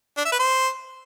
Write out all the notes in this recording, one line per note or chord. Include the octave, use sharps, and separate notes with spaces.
D4
E5
B4
C5